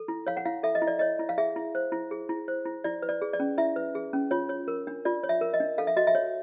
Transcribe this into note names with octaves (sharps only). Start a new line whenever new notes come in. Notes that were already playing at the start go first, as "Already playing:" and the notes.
Already playing: A4
E4
C#5 F5
F#5
E4 F5
A4 E5
D#5
E4
D5
C#5 D#5
E4
F5
G#4 E5
E4
C5
E4
G#4
E4
C5
E4
E4 D5
B4
D5
G#4
D5
C#4
E4 E5
B4
G#4
C#4
F4 C#5
C#5
A#4
D4
F4 D5
C#5
E5
A#4
D#5
D4
A4 F5
E5
F#4 D#5
E5
C#5